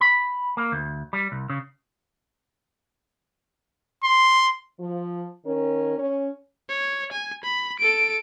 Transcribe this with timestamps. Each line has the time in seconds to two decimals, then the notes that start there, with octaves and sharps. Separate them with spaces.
0.01 B5
0.57 A#3
0.72 D2
1.13 G3
1.32 C2
1.50 C#3
4.04 C6
4.80 F3
5.45 D#3 C#4 A#4
5.99 C#4
6.69 C#5
7.12 G#5
7.44 B5
7.79 A4 D7